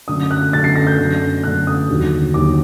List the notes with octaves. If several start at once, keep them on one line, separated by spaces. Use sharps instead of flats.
F#2 D3 A3 D#6
F#6
F#2 D3 A3 A6
C7
A#6
G6
F#2 D3 A3
F#2 D3 A3 F#6
D#6
D#2 D3 F#3
D#2 D3 F#3 D6